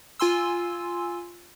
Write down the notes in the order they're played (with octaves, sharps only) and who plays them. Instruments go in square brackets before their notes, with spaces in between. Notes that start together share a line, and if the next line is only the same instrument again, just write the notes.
[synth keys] F4 G#5 C6 E6